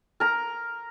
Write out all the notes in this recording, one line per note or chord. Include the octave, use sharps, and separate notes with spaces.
A#4 A#5